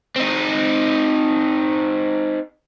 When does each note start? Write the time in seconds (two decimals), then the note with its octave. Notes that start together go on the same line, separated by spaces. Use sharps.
0.16 C4 D#4